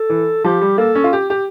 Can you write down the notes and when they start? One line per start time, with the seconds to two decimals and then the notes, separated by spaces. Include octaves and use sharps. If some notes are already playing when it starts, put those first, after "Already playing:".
Already playing: A4
0.10 E3
0.44 F3 G4
0.61 G3
0.78 A#3 A4
0.95 C#4
1.04 F4
1.13 G4
1.30 G4